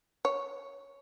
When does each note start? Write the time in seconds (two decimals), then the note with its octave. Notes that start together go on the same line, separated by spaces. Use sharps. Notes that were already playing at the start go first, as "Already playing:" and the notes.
0.25 C#5